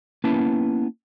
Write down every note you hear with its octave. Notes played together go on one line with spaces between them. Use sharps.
A#3 B3 C#4 E4 B4 A5